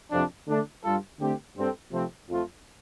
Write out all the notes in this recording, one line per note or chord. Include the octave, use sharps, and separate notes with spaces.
F2 C3 F3 D4
D3 A3 D4
G2 G3 F4 A4
D3 A3 C4 G4
G2 G3 C4 A4
C3 F3 A3 C4
F2 F3 A3 F4